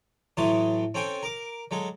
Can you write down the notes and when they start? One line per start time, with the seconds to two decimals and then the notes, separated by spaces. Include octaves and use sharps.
0.37 A2 E3 F#3 A5 C6 D#6
0.94 C4 C#4 A4 G5 G#5
1.23 A#4 D6
1.71 F#3 G#3 A4